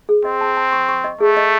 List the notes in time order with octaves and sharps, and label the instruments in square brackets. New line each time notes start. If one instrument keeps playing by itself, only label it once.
[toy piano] G#4
[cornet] C4 [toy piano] D#5
[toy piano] A5
A5
C#6
C#6
D#5
[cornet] A3 [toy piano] G#4
[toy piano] D#5